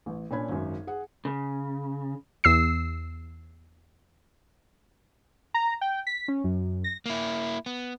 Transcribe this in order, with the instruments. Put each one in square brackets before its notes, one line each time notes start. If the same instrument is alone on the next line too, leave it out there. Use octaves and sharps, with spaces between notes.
[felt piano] A1
A#2 C#4 D4 B5 G#6
G#1 F#2
G#4 F#5
[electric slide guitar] C#3
[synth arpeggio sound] E2 E6 C7
[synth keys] A#5
G5
B6
C#4
F#2
A#6
[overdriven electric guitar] A#3 E4
B3